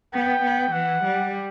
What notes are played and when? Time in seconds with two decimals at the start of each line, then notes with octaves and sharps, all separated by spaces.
0.14 B3 G5
0.43 B3
0.72 E3 F#5
1.03 G3